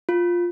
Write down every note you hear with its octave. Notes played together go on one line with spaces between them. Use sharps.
F4